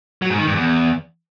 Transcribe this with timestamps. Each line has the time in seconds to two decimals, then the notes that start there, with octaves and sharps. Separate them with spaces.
0.22 F#3
0.30 G#2
0.39 D#3
0.47 G2
0.55 E2